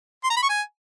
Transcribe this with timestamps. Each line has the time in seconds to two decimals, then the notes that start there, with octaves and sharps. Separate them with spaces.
0.24 C6
0.30 A#5
0.36 B5
0.43 C#6
0.49 G#5